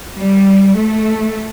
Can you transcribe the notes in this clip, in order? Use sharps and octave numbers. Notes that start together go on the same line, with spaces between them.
G3
A3